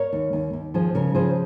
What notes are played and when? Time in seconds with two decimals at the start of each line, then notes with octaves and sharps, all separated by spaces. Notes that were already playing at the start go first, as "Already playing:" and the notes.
Already playing: A#4 C#5
0.13 D#2
0.33 D#2
0.53 D#2
0.74 F3 G#4 C5
0.95 C#3 A#4 C#5
1.15 F3 G#4 C5